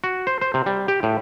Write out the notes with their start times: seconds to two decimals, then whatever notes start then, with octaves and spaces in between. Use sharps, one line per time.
0.04 F#4
0.27 C5
0.41 C5
0.54 C3
0.66 G3
0.88 G4
1.03 A2